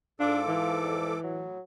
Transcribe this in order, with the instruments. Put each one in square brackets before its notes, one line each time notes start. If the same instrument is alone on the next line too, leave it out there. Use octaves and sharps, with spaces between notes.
[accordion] G#2 A4 D6 [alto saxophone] D4 [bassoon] F4
[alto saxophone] E3
[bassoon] F2
[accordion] A2 [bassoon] F#3